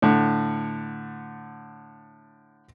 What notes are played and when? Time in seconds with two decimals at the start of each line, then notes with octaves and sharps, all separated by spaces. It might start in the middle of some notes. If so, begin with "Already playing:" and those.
0.02 A2 D3